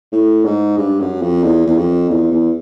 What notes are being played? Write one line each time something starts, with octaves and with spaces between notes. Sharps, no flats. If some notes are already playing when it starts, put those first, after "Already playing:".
A2
G#2
G2
F#2
F2
E2
E2
F2
E2
E2